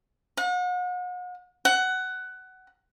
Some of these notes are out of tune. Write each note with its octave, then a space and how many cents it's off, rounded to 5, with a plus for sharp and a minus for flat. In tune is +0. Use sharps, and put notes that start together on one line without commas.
F#5 -40
F#5 +15